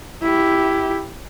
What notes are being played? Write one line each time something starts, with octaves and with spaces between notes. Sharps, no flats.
E4 G4